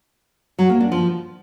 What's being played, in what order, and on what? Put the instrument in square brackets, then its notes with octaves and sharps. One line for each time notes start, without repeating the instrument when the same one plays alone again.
[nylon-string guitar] F#3
A#3
D4
F3